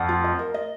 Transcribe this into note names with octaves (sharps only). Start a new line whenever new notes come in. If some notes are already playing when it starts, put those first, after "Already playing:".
Already playing: F2 F3 F#5
F4
D#5
A#4
D#5